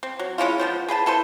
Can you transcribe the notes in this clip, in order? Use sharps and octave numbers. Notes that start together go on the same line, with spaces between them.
C4
F#3
G#3 C#4 E4 F4
F3 B3 C5
G#4 B4 G5 A5
E4 A4 B4 C5